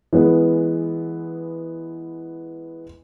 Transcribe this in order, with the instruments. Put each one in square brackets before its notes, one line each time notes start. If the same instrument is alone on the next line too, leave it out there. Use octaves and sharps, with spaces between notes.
[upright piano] E3 G#3 B3